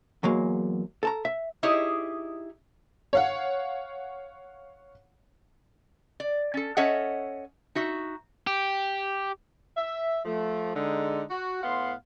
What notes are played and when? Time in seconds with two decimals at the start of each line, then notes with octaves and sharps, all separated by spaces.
0.23 E2 F#3 G#3 A#3
1.03 A4 A5 A#5
1.25 E5
1.63 D#4 E4 G4 G#4 C#5 D#5
3.13 C#5 F5 F#5
6.20 D5
6.54 C#4 A4
6.77 C#4 A4 C#5 D#5 E5 F#5
7.75 D#4 F#4 E5
8.47 G4
9.77 E5
10.25 F3 A3
10.75 D3 G#3 D#4
11.30 F#4
11.63 A2 B3 F5 F#5 C6